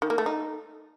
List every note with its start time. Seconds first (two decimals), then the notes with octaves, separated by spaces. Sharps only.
0.02 D#3
0.10 A#3
0.18 A3
0.26 D#4